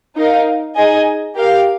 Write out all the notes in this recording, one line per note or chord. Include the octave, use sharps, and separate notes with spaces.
D#4 A#4 F5
D#4 G#4 D#5 G#5
G4 A#4 F5